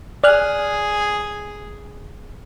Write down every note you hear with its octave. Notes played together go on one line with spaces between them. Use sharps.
G#4 D5 F6 F#6